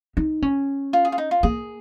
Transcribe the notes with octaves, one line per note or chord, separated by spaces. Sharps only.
D#4
C#4
F4
G#4
F4
D#4
F4
A#3 G#4